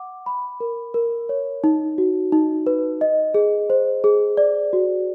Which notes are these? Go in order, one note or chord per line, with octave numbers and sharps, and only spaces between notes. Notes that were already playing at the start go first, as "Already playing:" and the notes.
Already playing: F#5 D6
B5
A#4
A#4
C#5
D#4
F#4
D#4
B4
D#5
G#4
C5
G#4
D5
F#4